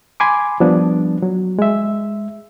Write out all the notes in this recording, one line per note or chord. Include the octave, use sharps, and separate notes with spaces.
G#5 B5 C6 D6
F3 G3 B3 D4
F#3
G#3 E5